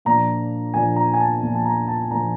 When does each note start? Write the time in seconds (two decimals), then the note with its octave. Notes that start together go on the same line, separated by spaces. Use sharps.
0.05 A#2 F3 A#3 D4 A#5
0.74 A#2 F3 A#3 D4 G#5
0.96 A#5
1.14 G#5
1.20 A5
1.42 A#2 F3 A#3 D4
1.55 A5
1.65 A#5
1.88 A5
2.11 A#2 F3 A#3 D4 A#5